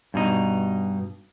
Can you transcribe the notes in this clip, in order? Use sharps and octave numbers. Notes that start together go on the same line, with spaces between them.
G2 B2 D#4